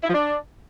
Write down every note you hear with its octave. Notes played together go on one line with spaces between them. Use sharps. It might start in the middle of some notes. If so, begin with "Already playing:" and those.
E4
F3
D4